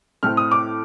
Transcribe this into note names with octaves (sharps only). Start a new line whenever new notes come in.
A2 A3 C4 F6
D#6
D6